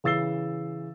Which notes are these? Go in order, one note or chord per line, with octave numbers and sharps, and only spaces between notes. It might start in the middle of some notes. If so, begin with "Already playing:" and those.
C#3 E3 E6 A6 C7 G7